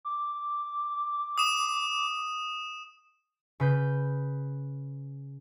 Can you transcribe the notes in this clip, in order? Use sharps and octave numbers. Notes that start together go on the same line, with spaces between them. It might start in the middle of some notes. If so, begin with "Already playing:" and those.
D6
D#6 E7
C#3 B4 G6